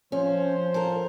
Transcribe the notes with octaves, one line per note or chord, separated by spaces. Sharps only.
F3 C#4 C5
A4 A#4